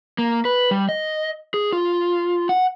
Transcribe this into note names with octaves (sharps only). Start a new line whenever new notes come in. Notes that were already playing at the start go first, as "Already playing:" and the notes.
A#3
B4
G3
D#5
G#4
F4
F#5